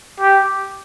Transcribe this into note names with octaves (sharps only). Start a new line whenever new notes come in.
G4